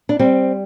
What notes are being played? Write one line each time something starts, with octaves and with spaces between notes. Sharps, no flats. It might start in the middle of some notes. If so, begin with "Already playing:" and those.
D4
G3 C4